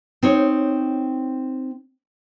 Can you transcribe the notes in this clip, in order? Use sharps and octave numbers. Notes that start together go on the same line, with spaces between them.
C4 D#4 C#5